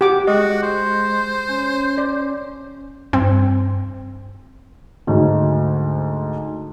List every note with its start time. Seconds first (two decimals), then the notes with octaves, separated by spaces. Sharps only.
0.01 G4 F#5 D6
0.27 G#3 F#4 D#5
0.63 C5
1.48 C#4
1.98 D5
3.13 G2 C4
5.07 D2 G#2